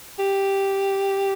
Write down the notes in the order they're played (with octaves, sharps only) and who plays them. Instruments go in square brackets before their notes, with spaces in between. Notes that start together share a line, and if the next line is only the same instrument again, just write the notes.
[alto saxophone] G4